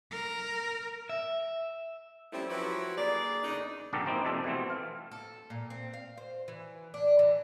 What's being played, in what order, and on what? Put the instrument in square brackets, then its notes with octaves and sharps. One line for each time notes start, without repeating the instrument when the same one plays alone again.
[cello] A#4
[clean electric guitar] E5
[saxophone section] F3 G3 A3 C4 C#4 E4
F3 F#3 E4 G4 B4
D3 A#3 G#4 D5
E2 C#3 D4 D#4
[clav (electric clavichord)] A#1 G2 D3 G4 A4 A#4
A#3 C4 D#4 E4
F2 C3 A4 D5
B2 E3 A3 C4
F5
[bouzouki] A4
A#2
C4
F5
C5
E3
D4
E3